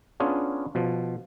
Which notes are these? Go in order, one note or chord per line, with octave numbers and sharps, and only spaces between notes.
B3 C#4 D4 F4 G#4
B2 F3